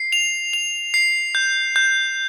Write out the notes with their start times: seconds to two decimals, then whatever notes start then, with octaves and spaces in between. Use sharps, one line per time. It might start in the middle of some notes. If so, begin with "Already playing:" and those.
Already playing: C7
0.12 F7
0.53 F7
0.94 C7
1.35 G6
1.76 G6